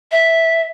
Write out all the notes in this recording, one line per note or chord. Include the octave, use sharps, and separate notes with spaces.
E5